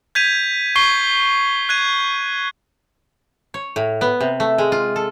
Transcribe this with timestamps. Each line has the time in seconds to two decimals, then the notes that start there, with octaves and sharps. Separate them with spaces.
0.15 G6 G#6 B6 D#7 F7
0.76 C#6 C7 G7
1.69 F#6 G#6 D#7
3.54 C#5
3.76 A2
4.01 B3
4.21 C3
4.40 A3
4.58 G#3
4.72 F4
4.96 A4